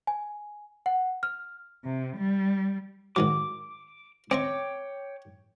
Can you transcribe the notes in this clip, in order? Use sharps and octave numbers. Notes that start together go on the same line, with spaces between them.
G#5
F#5
F6
C3
G3
G#2 D#3 F#3 D6
C4 C#5 D#5 G5 C#6 D6